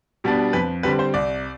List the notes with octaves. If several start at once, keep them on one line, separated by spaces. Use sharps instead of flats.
B2 G3 B3 D4
F2 B4
D3 G3 C4 B4
C5
C2 D5